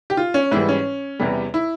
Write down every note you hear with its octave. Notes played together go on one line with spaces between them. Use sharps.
G4
F4
C#4
G#2 E3 G3 E4
C#4
E2 C3 E3 G3
E4